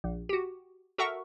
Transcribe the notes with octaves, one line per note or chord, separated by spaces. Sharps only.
A#1
F#4 G4
F#4 A4 A#4 E5 F#5 C#6